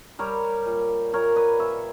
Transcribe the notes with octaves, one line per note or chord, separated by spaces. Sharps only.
G3 A#4 C#5
A#2
A#2 A#4 C#5
B4 D#5
A#2 C#5 E5